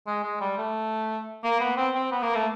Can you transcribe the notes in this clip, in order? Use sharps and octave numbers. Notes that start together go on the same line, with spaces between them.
G#3
G#3
G3
A3
A#3
B3
C4
C4
B3
A#3
A3